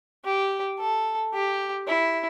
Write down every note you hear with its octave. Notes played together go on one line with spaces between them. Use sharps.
G4
A4
G4
E4